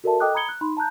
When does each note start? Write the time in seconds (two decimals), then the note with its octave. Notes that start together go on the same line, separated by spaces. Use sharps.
0.04 F#4 A4 A#4 D5 E5 A5
0.20 A4 D#5 G5 D6 D#6 F#6
0.35 A#5 B5 D#6 G#6 C#7 G7
0.49 F#6
0.61 D#4 B5 C6
0.77 A5 A#5 F#6 G6